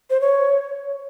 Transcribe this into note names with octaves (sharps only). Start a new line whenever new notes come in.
C5
C#5